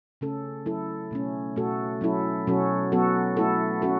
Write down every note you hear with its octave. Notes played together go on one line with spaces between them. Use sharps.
C#3 A3 C#4 A4
F#3 A3 E4 A4
B2 A3 C#4
B2 A3 F#4 A4
F#3 C#4 E4 A4
B2 F#3 C#4 F#4 A4
F#3 B3 F#4 A4
A3 E4 A4
C#4 F#4 A4